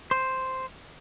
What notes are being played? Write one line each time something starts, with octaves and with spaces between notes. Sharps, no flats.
C5